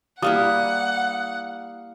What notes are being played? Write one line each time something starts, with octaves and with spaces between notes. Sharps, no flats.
G3 A#3 E4 F5 F#5 D#6